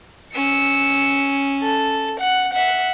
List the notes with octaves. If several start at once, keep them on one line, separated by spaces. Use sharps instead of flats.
C#4 E6 C#7
A4
F#5
E5 F#5